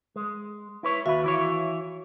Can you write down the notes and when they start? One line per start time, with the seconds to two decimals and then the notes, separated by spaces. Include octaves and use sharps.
0.16 G#3
0.83 E4 B4 C#5
1.06 D#2 F#4 B4 E5 F5
1.24 E3 E4 C#5